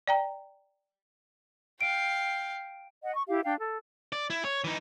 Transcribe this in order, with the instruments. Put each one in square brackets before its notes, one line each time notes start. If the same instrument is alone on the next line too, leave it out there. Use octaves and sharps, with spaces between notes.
[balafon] D5 G5 A#5
[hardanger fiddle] F5 G5 [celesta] D7
[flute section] D#5 F#5
C#6
E4 G4 F5
D4 F5 G5
A4
[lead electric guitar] D5
E4
C#5
E3 D#4